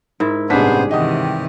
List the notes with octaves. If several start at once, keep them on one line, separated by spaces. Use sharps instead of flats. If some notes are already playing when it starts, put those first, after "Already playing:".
G#2 E4 A#4
A1 G2 C3 B3 D4 G#4 C5 B6
C3 D#3 E3 G4 D#5 F#5 D#6